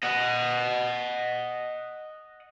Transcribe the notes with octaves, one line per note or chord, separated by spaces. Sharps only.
D#5 F#5